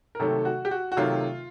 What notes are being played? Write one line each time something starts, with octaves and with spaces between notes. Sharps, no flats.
A#4
C3 D#3 F#3 A3 A4
F#4
G4
F#4
F#4
C3 D#3 F#3 A3 F4